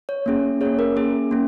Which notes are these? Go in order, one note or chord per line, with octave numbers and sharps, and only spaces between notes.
C#5
A#3 C#4 G#4
A#3 C#4 G#4 C#5
A#4
A#3 C#4 G#4
A#3 C#4